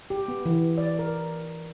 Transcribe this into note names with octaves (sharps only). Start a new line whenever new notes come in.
G4
B3
E3
D5
A#4